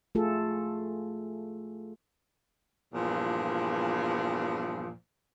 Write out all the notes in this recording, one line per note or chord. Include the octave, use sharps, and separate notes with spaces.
A3 F4 G#4 A4
E2 G2 A#2 F3